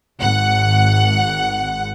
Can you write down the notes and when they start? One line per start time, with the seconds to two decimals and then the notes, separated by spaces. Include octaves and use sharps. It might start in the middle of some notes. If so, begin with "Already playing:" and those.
0.17 G#1 F#5